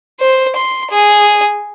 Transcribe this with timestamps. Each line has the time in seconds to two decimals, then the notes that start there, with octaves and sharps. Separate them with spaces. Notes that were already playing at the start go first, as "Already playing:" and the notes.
0.21 C5
0.56 C6
0.90 G#4